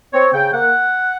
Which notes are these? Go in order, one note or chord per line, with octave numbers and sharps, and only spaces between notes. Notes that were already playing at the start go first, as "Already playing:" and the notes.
C4 C#5
C#3 G5
A#3 F#5